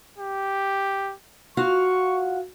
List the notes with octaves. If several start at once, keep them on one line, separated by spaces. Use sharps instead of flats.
G4
F4 F#4 F5 C#6